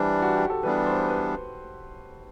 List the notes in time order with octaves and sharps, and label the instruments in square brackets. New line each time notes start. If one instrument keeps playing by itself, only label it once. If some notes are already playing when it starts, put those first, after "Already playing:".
Already playing: [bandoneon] E3 G3 D4 [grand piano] C5
[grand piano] F#4
G4
A4
[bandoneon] E3 G3 B3 D4 [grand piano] B4
[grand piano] C5
B4